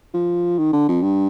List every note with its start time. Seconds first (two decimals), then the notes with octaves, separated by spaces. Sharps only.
0.14 F3
0.58 D#3
0.73 D3
0.88 F2
1.02 G2